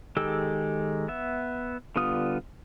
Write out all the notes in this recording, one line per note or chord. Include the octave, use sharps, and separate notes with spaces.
D#3 G#3 G4 A4 E6
B3 E5
D3 G3 B3 F4 D#6